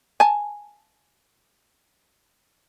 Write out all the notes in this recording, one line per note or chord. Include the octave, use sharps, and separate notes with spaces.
G#5 A5